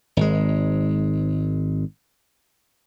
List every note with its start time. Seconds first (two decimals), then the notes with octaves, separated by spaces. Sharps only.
0.17 G#1 G#3